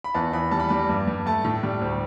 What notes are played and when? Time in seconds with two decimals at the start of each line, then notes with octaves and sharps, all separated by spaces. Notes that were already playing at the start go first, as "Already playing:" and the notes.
0.04 B5
0.14 E2 A5
0.33 E2 B5
0.51 G3 A5
0.60 B5
0.69 G3 A5
0.89 G2
1.08 G2
1.26 A3 A5
1.45 A2
1.63 G3
1.82 D2